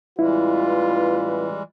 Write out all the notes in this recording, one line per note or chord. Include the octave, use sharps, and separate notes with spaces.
A1 E3 G3 G#3 E4 F4 B4